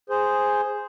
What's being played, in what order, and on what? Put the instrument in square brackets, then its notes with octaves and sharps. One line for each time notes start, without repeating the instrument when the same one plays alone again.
[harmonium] G#4 C5